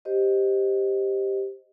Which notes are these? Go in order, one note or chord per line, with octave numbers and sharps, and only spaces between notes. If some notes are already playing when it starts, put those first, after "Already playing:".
G4 C5 D#5